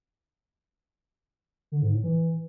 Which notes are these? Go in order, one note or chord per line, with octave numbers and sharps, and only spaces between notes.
D3
G#2
A2
E3